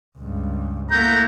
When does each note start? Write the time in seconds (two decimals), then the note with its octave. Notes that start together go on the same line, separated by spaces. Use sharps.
0.18 C#2 G2
0.91 A3 A#3 E4 F#5 A#5 G6